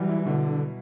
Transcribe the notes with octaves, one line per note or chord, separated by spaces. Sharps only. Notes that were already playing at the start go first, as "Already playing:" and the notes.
Already playing: E3 F#3 G3
E4
B2 D3